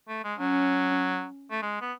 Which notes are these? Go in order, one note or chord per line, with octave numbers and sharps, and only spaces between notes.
A3
G#3
F#3 C#4
A3
G#3
B3